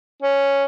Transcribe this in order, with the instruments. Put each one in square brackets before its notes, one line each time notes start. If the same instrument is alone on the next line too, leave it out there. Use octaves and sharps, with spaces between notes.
[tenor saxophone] C#4